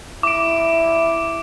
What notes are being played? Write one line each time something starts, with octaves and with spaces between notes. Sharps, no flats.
E4 D6 D7